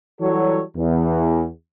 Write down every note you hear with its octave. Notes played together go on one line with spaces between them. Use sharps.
E3 F#3 G3 F#4 A4 C#5
E2